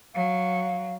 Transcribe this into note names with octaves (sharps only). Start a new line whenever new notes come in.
F#3 F5